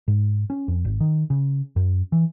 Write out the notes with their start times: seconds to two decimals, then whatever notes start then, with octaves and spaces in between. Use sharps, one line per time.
0.08 G#2
0.50 C#4
0.68 F2
0.85 G#1
1.00 D#3
1.30 C#3
1.76 F#2
2.12 E3